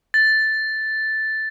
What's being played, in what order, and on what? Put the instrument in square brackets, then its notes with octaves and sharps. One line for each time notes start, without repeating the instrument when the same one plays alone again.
[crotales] A6